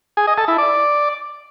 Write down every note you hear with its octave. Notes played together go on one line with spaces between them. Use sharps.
G#4
D#5
A4
E4
D5